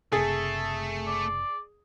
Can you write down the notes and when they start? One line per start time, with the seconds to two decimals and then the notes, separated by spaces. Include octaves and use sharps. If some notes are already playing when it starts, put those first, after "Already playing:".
0.12 F#1 C3 A3 G#4 A4
1.07 D5